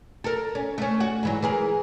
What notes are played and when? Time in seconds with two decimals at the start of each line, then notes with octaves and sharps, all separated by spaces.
0.24 A4 A#4
0.55 C#4
0.78 A3 C#4
1.00 F#4
1.23 G#2 E3 F#3
1.42 E3 G#4 A#4